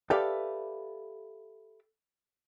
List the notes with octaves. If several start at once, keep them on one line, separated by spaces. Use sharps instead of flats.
G4 A4 B4 D5 E5 F5